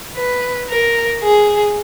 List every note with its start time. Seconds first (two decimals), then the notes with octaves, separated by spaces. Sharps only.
0.15 B4
0.69 A#4
1.22 G#4